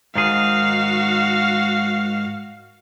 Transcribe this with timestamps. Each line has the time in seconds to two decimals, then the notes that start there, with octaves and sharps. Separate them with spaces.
0.15 G#2 D#3 F#4 G#4 F5